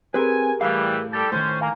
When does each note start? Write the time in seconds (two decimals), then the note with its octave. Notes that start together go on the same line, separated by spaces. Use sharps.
0.14 C4 G4 G#4 A#4 B4 G#5
0.61 A2 E3 G3 F5
1.13 G3 G4 A4 A6
1.32 A2 D#3 C#4 C5
1.61 A#3 A#4 F5 G#5 A#5